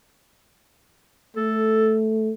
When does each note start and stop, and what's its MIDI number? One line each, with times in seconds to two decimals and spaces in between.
1.37 2.32 57
1.37 1.97 69